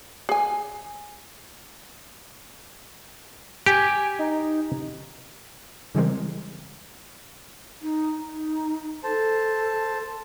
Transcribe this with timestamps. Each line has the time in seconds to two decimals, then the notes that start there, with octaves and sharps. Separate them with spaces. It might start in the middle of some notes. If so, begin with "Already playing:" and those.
0.29 G#4 G#5
3.66 G4 G#5
4.19 D#4
5.95 C#3 E3 G3 G#3 C4 A#4
7.82 D#4
8.21 D#4
9.04 A4 C5 A5